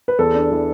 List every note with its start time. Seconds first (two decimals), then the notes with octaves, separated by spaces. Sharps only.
0.08 B4
0.19 E2 A4
0.35 D4
0.51 E3